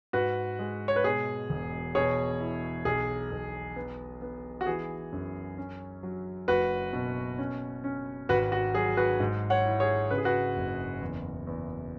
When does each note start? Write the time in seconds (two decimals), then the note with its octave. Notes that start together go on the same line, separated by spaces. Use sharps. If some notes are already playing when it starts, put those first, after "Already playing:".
0.13 G#2 F#4 B4
0.59 G#3
0.88 C#5
0.96 B4
1.04 B2 G#4
1.50 E1
1.95 B2 G#4 C#5
2.40 E4
2.85 B1 G#4
3.31 B1
3.76 B3
4.22 B3
4.61 F#4
4.66 E3 G#4
5.12 F#2
5.58 C#4
6.03 F#3
6.48 F#1 F#4 B4
6.93 B2
7.38 C#4
7.84 C#4
8.29 G#1 F#4 B4
8.52 F#4
8.75 F#3 G#4
8.97 F#4 B4
9.20 G#2
9.50 C#5 F#5
9.66 E4
9.80 G#4 C#5
10.10 C#3 B4
10.18 G#4
10.25 F#4 B4
10.56 F#1
11.01 E2
11.47 E2